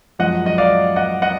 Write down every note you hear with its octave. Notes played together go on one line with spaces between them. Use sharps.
F#2 F3 G#3 D#5 F#5
D#5
D5 F5
D#5 F#5
D#5 F#5